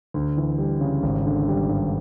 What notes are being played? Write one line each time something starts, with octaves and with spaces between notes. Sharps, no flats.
D2
E3
G3
C#3
G#1
D3
G3
G2